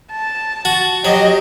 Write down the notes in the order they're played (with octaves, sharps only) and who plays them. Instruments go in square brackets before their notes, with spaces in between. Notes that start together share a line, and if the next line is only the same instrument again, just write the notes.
[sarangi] A5
[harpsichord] F#4
[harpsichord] F#3 [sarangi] G4 [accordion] D#5